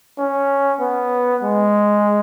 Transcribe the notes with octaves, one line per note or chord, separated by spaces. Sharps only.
C#4
B3
G#3